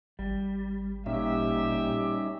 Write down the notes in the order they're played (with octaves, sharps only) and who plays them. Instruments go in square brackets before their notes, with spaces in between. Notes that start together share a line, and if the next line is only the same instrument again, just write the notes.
[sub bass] G#1 [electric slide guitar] G3
[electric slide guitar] A#2 [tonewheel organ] G3 C#4 D#4 [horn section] G4 E5